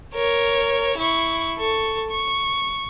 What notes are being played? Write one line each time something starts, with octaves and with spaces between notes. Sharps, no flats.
A#4 C#5
E4 C#6
A4 C#6
C#6